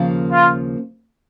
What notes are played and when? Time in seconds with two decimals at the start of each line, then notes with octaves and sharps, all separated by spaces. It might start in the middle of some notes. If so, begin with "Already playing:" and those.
Already playing: D#2 C#3 F3 A#3
0.31 F4